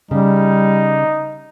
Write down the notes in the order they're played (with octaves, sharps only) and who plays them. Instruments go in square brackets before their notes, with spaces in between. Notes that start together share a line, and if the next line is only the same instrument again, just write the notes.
[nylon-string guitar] C#3 [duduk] G3 [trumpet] D#4